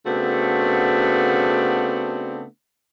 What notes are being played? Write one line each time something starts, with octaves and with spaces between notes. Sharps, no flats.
C#3 A3 B3 C4 D4 F#4